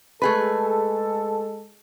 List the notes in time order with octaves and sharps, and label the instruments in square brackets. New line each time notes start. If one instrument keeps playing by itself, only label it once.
[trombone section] G#3 A4 [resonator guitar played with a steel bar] A3 G#4 B4